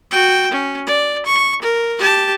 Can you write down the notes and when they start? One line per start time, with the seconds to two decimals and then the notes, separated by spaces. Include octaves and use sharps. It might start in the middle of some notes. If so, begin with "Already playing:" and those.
0.11 F#4 G5
0.51 C#4
0.87 D5
1.26 C#6
1.62 A#4
1.99 G4 A5